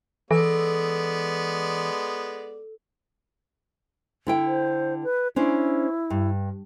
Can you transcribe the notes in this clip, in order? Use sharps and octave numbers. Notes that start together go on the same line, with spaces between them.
E3 G#3 B3 A4 D5
D3 E4 G5
C5
B4
C#4 D4 E4 C5
G2